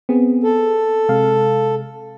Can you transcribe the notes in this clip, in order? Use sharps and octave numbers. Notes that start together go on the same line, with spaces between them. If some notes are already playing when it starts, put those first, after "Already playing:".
B3 C4 G#4
A4
C3 G#3 F5